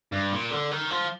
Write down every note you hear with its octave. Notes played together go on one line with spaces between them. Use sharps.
G2
A#2
D3
D#3
F3